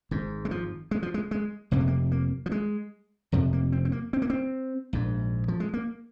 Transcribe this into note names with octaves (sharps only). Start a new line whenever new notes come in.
G#1 G#2
G#3
F3
G#3
F3
G#3
G#3
F1 F2 C3 A#3
G#3
A#3
A#3
F3
G#3
F1 F2 C3 F3
A#3
C4
C4
A#3
C4
A#3
C4
A#1 G#2
F3
G#3
A#3